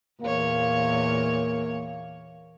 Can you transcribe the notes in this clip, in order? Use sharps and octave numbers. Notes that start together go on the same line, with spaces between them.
E2 A#2 A#3 C#5